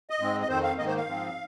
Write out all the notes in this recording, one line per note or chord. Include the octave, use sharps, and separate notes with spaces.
D#5
G#2 G#3 C4
D#5
F2 D#3 C4 C5
F5
G#2 D#3 A#3 D#5
C5
F5
G#2 F3 C4